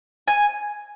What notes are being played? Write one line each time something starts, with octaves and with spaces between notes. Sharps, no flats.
G#5